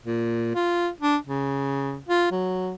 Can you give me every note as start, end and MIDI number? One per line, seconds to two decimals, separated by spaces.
0.06 0.50 46
0.55 0.89 65
1.00 1.17 62
1.27 1.98 49
2.09 2.30 65
2.32 2.75 54